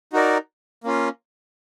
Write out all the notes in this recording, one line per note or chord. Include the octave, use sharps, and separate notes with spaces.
D#4 F#4 A#4 D5
A#3 C#4 F4